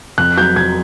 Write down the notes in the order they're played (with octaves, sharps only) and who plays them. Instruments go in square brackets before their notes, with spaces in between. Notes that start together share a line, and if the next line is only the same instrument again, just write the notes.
[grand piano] F2 F#6
F#3 G6
F2 G#6